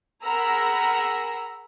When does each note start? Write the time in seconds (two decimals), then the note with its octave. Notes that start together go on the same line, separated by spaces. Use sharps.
0.24 G#4 A#4 F#5 A#5 B5 E6